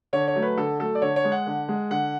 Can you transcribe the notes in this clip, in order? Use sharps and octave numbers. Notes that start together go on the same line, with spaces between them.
D3 C#5
C#5
F#3 A3
B4
D3 A4
F#3 A3 A4
D5
D3 C#5
C#5
G#3
F#5
D3
G#3
D3 F#5